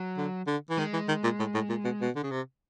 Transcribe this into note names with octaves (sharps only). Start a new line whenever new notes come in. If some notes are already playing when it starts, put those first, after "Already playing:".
Already playing: F#3
D3
D3
E3
D#3 G#3
E3
D#3
A#2
A2
A2
A#2
B2
B2
D3
C#3
C3